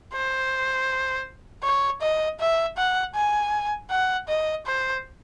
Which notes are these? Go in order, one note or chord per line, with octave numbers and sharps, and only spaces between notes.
C5
C#5
D#5
E5
F#5
G#5
F#5
D#5
C5